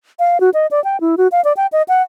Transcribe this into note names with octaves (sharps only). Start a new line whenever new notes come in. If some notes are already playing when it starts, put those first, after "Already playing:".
F5
F#4
D#5
D5
G5
E4
F#4
F5
D5
G5
D#5
F#5